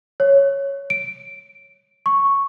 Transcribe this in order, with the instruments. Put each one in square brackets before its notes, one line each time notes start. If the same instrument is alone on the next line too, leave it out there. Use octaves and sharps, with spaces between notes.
[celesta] C#5
D7
C#6